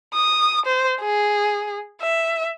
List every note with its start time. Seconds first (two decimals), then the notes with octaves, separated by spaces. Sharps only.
0.14 D#6
0.66 C5
1.00 G#4
2.01 E5